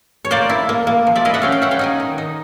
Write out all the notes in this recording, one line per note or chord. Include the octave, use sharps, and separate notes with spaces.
C#5
A#3 C5 D5
E4
A#3
A#3
F3
D5 E5
E4 D#5 F5
E5 F#5
C#4 F5 G5
F5 G5
C#4 E5 F#5
F5 G5
D#4 F#5 G#5
D#3
D#4